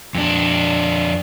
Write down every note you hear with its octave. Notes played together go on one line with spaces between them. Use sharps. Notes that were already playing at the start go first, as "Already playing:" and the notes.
F2 D4